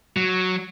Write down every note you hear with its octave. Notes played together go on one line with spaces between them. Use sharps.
F#3